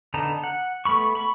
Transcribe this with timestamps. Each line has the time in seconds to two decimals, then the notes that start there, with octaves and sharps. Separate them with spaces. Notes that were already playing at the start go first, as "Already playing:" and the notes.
0.14 D3 B3 D#4 A5 A#5
0.44 F#5
0.85 A3 B3 B5 C#6
1.15 B5 C#6